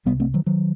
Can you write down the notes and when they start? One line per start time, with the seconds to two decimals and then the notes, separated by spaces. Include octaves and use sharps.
0.05 C2 C3 G3 B3
0.20 A3 C4
0.34 D#3 F#3
0.46 D#3 F#3